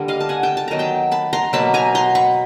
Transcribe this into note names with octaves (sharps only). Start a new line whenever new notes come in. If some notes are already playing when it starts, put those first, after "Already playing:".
Already playing: D3 G3 A#3 D4
D#5 F5
A5
F#5 G#5
G5 A5
A5
D#3 F#3 B3 D#4 A#5
G5 A5
A5 B5
A#5 C6
B2 F#3 A#3 A5 B5
G#5 A#5
A#5 C6
B5 C#6